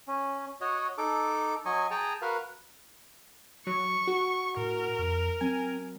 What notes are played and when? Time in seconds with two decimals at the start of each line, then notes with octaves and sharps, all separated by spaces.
0.08 C#4
0.61 F#4 C#5 D#5
0.98 D#4 A4 D6
1.65 F#3 D#5 G#5 C#6
1.91 G#4 G5 A5 A#5
2.22 F#4 A#4 B4 F5
3.67 F#3 C#6
4.07 F#4
4.57 A2 A#4
4.99 F2
5.41 F#3 C4 G#5